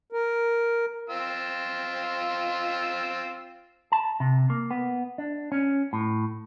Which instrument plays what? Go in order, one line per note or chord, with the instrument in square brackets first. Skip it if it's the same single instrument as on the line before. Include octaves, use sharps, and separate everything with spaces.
[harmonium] A#4
[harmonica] C4 F4 E6
[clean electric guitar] A5
C3
A#3
B3
D4
C#4
A2